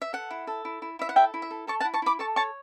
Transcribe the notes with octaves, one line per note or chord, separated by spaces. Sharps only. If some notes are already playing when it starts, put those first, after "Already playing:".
E5
A4 F#5
E4
A4
E4
E4
E4 E5
F#5
A4 E5 G5
E4
E5
A4
A4 A5 C#6
F#5 A5
E4
A5 C#6
E4 B5 D6
A4 A5 C#6
C#5 A5 C#6